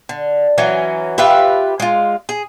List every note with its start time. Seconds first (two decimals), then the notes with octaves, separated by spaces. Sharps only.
0.09 D3
0.58 E3 F#3 C#4
1.18 F4 G4 B4 E5
1.80 G#3 F4
2.29 G#4